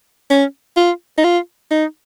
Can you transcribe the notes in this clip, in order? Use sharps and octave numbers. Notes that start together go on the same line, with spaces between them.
C#4
F4
D#4
F4
D#4